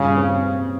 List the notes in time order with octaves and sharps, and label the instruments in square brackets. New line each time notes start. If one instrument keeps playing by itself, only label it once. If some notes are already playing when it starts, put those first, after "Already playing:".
Already playing: [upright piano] G2 A#2 [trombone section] C#3
[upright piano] C4